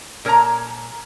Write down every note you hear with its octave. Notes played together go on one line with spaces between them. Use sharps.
A#2 A#4 C#5 A5 A#5